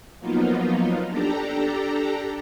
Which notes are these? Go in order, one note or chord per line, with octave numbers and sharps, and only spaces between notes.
F3 F#3 A#3 B3 D#4 F4
D4 G4 A4 A#5